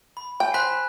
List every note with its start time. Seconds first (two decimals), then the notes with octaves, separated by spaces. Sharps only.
0.17 B5
0.40 G5 G#5
0.54 C5 B5 F#6 B6